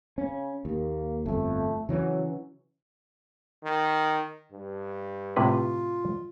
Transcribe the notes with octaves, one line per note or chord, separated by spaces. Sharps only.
C#3 C#4
D#2 A#3
G1 F2 A3
C#3 E3 F#3 C#4
D#3
G2
A2 C3 F4 B4